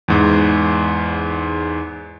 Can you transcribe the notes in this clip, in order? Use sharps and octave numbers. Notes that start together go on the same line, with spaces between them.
E2 G#2